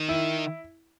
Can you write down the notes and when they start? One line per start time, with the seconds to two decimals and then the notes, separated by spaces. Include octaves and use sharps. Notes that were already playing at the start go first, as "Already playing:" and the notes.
Already playing: D#3
0.09 E4